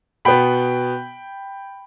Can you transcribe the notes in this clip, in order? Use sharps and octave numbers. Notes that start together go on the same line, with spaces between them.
B2 B3 G5 B5